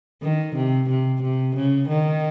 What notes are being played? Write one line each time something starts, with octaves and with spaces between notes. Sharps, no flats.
D#3
C3
C3
C3
C#3
D#3